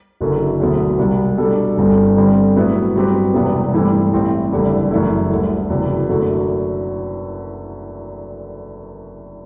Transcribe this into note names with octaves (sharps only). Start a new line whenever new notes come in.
F#1 F#2 D3 F#3
E1 D2 D3 F#3 B3
C2 B2 G3
B2 G3 D4 A4
G1 G2 D3 G3 C4
G2 D3 G3 C4
A2 F#3 B3 E4 B4
G2 F#3 C4 G4 B4
E1 E2 C3 G3 B3
G2 E3 A3 C4 G4
A1 A2 G3 C4
F#1 E2 D3 G3
F#1 F#2 E3 A3 E4
D2 D3 G3 D4
F#1 E2 C3 F#3
F#2 D3 F#3 A3